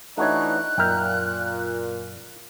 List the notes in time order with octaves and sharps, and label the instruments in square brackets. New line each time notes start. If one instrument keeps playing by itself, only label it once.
[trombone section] E3 D4 D#4 [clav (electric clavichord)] A3 F#4 C#5 [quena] F#6
[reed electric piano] F#2 F6 [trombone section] A#2 [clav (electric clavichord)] A#4 E5 G5